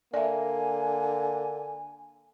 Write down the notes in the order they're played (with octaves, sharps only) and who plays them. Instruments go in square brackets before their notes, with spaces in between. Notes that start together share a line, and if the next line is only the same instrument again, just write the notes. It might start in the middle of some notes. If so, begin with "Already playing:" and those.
[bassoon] D3 [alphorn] A#3 [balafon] D5 E5 [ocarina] G#5